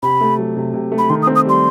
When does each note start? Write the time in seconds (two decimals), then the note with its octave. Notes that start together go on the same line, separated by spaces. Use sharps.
0.03 C3 B5
0.21 A3
0.38 F#3
0.56 C3
0.74 C3
0.92 A3
0.98 B5
1.10 D#3 C6
1.22 D#6
1.27 C4
1.36 D#6
1.45 G3 C6